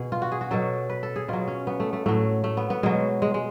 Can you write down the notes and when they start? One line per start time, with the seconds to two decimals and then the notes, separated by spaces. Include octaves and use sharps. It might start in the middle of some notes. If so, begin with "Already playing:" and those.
Already playing: B2 G#4
0.12 F4
0.22 F#4
0.32 G#4
0.41 F#4
0.51 B2 F#3 A4
0.90 B4
1.03 A4
1.16 G#4
1.28 B2 F#3 F4
1.48 C#4
1.67 B3
1.80 A3
1.93 A3
2.06 A2 F#3 A3
2.44 A3
2.57 B3
2.70 B3
2.83 B2 F#3 G#3
3.22 G#3
3.34 G#3